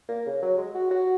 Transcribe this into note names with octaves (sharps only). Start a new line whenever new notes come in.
A#3
C#3
F#3
G#3
F#4
F#4